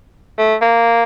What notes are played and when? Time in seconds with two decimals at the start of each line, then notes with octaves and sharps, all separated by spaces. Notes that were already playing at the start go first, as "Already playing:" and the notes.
0.38 A3
0.62 A#3